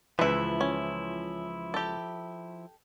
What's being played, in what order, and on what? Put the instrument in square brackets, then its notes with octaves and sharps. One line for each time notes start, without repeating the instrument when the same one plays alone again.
[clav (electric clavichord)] C#2 E3 [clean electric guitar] F3 E4 [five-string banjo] B4 E5
[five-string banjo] C#4
G4 A4